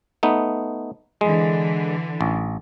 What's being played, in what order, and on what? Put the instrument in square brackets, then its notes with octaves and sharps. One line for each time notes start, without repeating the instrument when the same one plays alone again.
[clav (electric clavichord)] A3 B3 D#4
[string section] D3 E3 [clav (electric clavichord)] G#3
[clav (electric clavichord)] A1